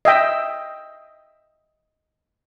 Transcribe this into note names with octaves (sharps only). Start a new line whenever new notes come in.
D#5 E5 G5